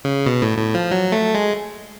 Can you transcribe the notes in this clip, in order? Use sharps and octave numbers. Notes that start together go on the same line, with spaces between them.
C#3
B2
A2
A2
F3
F#3
A3
G#3